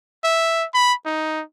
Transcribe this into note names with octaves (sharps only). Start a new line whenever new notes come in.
E5
B5
D#4